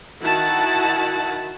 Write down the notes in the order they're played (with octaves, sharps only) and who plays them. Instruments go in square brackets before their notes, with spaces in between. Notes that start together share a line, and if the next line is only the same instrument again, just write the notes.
[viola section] D#3 E4 F#4 F#5 A5